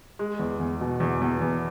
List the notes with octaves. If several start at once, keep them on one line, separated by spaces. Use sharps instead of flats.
G#3
E2
E2
B2
E2
E2
E2